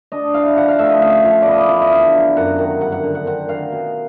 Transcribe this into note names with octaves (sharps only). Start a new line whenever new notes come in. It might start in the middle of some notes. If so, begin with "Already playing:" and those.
D4 D#5
E3 F5
F3 F#5
F5
A3 E5
D#5
C#4 F5
F3
D5
B3 D#5
D5
E3
D#5
D4 F5
F#3
F#2 F#5
D#3
G2 F#5
F#5
D3
F#5
C4 F#5
D#3 F5
B2